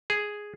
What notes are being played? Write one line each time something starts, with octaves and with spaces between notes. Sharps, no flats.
G#4